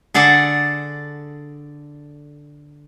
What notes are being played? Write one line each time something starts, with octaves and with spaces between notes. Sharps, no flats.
D3 G#4 A4 D5 F#5